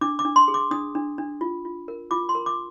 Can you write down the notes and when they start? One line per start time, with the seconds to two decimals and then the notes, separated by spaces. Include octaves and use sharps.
0.01 D4 D6
0.19 D6
0.25 D4
0.36 C6
0.48 G#4
0.54 D6
0.71 D4 D#6
0.95 D4
1.18 D4
1.41 F4
1.65 F4
1.88 A#4
2.11 F4 D6
2.29 C6
2.35 A#4
2.46 D6